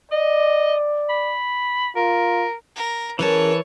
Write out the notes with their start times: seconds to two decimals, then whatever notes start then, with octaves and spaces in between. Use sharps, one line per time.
0.12 D5 D#5
1.09 B5
1.96 F4 A#4
2.76 A#4
3.19 E3 C#4 G#4 A#4 B4 C#5 A5